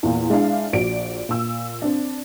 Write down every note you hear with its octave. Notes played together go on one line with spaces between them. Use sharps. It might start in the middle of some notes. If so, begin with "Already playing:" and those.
E2 A#2
G#3 D4 E4 E5 F5
A#1 F#4 D5 D7
A#2 E6
C4 D4